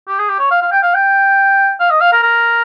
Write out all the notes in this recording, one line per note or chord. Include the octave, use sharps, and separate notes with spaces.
G4
G#4
G4
C#5
F5
F5
G5
F5
G5
F5
D#5
F5
A#4
A#4